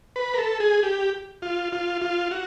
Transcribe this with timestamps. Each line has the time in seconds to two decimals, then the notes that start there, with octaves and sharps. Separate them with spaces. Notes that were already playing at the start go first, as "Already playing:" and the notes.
0.16 B4
0.34 A#4
0.38 A4
0.60 G#4
0.83 G4
1.42 F4
1.72 F4
2.02 F4
2.31 F#4